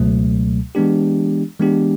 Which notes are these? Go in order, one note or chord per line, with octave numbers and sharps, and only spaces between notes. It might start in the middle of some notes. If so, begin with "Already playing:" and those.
Already playing: C#2 B2 F#3 A3
E3 G#3 B3 D4 G4
E3 G#3 B3 D4 G4